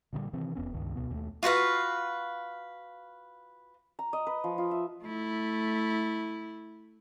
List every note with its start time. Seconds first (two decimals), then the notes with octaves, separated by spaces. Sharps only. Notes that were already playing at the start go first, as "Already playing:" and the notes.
0.13 A#2 D3 E3 G3
0.33 C3 D#3 E3 C4
0.55 F1 F2 B3 C#4
0.74 C#2 G2 D#3
0.95 C#2 B2 B3
1.11 D#2 G#3 A3
1.43 F4 F#4 B4 F5
3.99 A#5
4.13 D#5
4.27 B4
4.44 F3
4.58 F4
4.71 E5
5.04 A3 E4